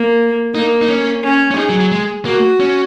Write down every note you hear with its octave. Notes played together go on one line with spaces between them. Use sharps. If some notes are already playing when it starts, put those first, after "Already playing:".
Already playing: A#3
A#3 D#4
D#4
C#4
C#4
C#4
D#4 G#4
F#3
F#3
G#3
A#3 F#4
C#4